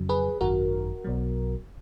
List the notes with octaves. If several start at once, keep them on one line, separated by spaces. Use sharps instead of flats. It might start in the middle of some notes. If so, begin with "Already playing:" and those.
Already playing: F2 C#3 F#3
G#4 B4
G#1 F#2 D#3 F#4 A#4
B1 B2 F#3